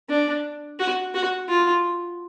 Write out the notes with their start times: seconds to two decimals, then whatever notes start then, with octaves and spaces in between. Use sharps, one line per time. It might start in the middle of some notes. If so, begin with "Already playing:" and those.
0.09 D4
0.80 F#4
1.14 F#4
1.49 F4